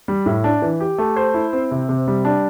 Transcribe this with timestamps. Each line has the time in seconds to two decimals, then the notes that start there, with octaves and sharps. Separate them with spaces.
0.08 G3
0.26 A2
0.44 D4
0.62 E3
0.80 G4
0.98 A3
1.16 C5
1.34 E4
1.53 C4
1.71 C3
1.89 C3
2.08 G3
2.25 D4